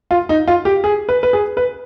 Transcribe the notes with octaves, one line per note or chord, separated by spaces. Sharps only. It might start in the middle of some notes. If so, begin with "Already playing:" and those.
F4
D#4
F4
G4
G#4
B4
B4
G#4
B4